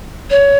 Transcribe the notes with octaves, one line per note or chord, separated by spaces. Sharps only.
C#5